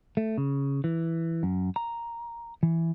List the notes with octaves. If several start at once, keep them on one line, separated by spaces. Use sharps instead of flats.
A3
C#3
E3
F#2
A#5
E3